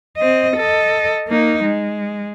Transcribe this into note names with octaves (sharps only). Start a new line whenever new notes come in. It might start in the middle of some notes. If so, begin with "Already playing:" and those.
C4 D#5
A4 D#5
A#3 D#4
G#3